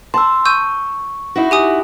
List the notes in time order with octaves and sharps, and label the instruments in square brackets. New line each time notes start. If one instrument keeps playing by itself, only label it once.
[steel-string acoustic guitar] A5 [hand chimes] C6 E6
[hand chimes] C#6 [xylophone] E6 G6 D#7
[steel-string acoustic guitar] D#4 E4 F#4
[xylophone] G4 G#5 D#6